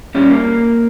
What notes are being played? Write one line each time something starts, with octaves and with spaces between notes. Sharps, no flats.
A#2 G3 C#4
A#3